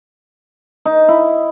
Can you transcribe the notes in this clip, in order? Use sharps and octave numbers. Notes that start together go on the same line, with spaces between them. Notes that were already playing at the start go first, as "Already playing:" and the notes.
D#4
E4